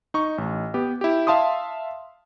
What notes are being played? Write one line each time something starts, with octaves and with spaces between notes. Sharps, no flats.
D#4 C#6
A1
B3 G4
E4 G4
E5 F5 A5 C6 D#6